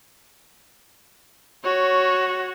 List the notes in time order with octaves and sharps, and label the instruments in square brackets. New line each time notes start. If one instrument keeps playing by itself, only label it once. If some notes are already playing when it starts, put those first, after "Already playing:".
[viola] F#4 [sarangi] C#5